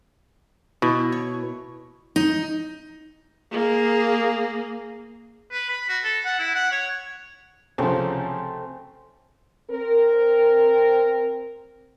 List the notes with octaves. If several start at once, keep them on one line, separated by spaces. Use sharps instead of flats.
B2 E4
C#5
D#4
A#3 G#4
B4
B5
F#4
A4
F#5
E4
F#5
C#5
C2 C#3 F3 A3 C4 C#4
C4 A#4